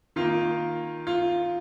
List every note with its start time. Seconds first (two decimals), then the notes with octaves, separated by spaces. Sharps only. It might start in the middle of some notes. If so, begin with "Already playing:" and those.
0.16 D#3 A#3 F4
1.07 F4